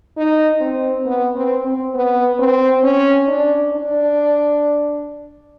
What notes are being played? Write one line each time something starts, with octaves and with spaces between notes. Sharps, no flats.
D#4
C4
B3
C4
C4
B3
C4
C#4
D4
D4